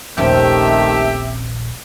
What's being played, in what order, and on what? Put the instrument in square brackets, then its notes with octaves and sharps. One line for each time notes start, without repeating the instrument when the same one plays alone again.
[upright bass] D#1 A#1 [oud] C3 C#4 [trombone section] D#3 A3 [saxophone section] G4 E5